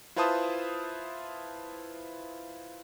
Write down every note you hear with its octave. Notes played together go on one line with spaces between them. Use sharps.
E4 F4 B4 C5 A5 D#6